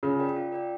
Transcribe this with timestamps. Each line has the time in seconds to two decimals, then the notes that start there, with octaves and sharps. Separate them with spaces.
0.03 C#3 F4
0.19 A#4 D5 G5
0.36 F4
0.52 A#4 D5 G5